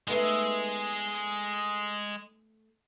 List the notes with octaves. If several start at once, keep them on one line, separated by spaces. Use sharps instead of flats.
G#3 A3 B3 D#4